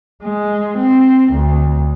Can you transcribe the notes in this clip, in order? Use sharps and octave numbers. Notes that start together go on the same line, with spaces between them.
G#3
C4
D2